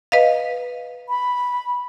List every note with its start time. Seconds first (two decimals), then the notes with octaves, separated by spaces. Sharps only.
0.12 B4 D#5 F5
1.09 B5